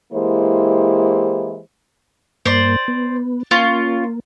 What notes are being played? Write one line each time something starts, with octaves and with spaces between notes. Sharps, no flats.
E3 G#3 A#3 E4 G4 C5
G2 A#3 C5 D5
B3
A#3 C#4 F4